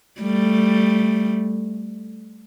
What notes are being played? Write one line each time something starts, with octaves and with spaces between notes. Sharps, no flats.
G3 A3